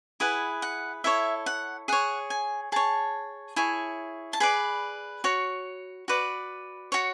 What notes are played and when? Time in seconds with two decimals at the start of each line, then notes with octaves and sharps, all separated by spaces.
0.20 E4 G#4 B4 F#5
0.62 F#5
1.04 E4 A4 C#5 E5
1.46 F#5
1.88 G#4 C#5 F#5
2.30 G#5
2.72 G#4 C#5 A5
3.56 E4 G#4 C#5
4.33 A5
4.40 G#4 B4 D5 B5
5.24 F#4 C#5
6.08 F#4 B4 D5
6.92 F#4 C#5